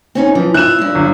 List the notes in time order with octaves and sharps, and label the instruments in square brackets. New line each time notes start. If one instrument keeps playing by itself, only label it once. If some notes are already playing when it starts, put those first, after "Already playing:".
[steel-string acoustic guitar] C4 C#4 D#4
[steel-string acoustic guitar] E3 [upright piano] F3
[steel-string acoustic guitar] E4 F4 [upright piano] F#6 E7
[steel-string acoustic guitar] G2 E4
[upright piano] G1